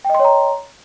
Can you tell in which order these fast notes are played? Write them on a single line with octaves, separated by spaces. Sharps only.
G5 D#5 C6 C#5 A#5